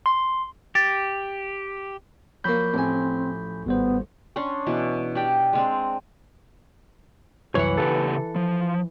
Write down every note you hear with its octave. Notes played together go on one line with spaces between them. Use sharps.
C6
G4 A6
F3 F#3 A#3 B5 G6
A1 C4 G#5
G#1 G3 B3 C5
C#4 D4 C6 C#6
B2 E3
D4 G4 G5
G#3 C4 D4
C2 F#2 E3 C#5 F#5
C#3 G4 A4 B4
F3